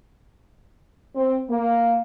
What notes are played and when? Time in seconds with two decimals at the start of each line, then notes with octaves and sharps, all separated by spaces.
1.14 C4
1.49 A#3